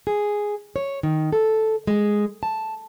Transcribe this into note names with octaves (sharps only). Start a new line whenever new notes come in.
G#4
C#5
D#3
A4
G#3
A5